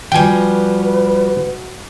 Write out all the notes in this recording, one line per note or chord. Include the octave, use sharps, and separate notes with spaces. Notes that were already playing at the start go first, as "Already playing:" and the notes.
F3 G3 F#4 B4 G5 G#5